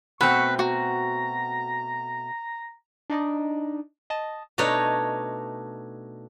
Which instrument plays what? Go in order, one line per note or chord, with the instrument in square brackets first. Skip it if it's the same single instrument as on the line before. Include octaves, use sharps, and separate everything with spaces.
[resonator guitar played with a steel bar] B2 A3 C4 [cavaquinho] B4 [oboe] C#6
[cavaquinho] F#4 [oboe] A#5
[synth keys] D4 D#4 D5 D#5
D#5 A5
[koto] B2 A3 D4 D#4 C#5